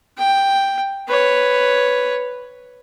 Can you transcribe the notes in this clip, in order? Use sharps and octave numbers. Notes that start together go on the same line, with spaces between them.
G5
B4 C#5